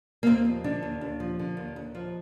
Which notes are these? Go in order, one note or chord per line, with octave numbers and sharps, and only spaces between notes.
A#3
D#2 C4
F3
D3 D4
D#2
D#2
F3
D3
D#2
D#2
F3